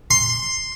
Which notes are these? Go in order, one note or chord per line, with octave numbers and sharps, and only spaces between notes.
C6